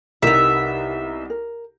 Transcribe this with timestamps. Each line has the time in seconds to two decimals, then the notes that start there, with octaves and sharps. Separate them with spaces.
0.22 C2 B3 D#4 G4 A#4 E5
1.30 A#4